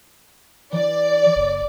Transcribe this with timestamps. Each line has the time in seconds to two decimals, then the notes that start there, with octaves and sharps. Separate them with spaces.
0.73 E3 D5
1.35 F#1